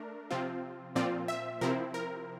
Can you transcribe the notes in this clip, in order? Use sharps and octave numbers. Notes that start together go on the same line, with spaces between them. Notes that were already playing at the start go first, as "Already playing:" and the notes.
Already playing: A3 D4 A#4
C3 F3 C4 F4
A#2 F3 C4 F4 D5
E5
C3 F3 C4 E4 A#4
A#4